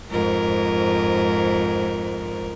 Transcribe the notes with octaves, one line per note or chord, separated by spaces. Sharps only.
F2 G#2 A#4